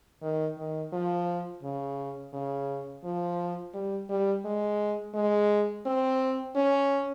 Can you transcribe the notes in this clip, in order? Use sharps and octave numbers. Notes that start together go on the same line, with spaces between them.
D#3
D#3
F3
C#3
C#3
F3
G3
G3
G#3
G#3
C4
C#4